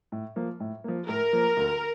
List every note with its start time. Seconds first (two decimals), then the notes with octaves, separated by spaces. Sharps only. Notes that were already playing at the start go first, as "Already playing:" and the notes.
0.12 A2
0.36 F3 A#3
0.60 A2
0.84 F3 A#3
1.08 A2 A#4
1.33 F3 A#3
1.57 D2